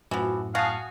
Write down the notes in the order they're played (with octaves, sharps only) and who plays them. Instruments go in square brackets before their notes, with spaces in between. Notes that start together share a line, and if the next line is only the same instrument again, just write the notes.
[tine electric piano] F#2 A2 [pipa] E3 F3 [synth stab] F#4
[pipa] F#4 [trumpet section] F5 [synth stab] G#5 A5 D#6